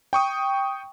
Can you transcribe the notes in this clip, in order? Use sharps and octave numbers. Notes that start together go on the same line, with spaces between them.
G5 C#6 D#6